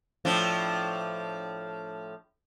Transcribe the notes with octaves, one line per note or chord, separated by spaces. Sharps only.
A2 F3 D4